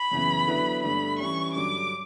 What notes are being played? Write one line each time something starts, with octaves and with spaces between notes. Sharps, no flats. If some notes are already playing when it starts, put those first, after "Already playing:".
Already playing: B5
F#2 C#3 E3 B3
D3 F#3 B3 E4 B4
G2 D3 A3 B5
E3 G3 C#4 C#6
G2 D3 F#3 D6